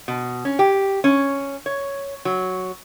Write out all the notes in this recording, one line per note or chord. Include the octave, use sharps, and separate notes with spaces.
B2
C#4
G4
C#4
C#5
F#3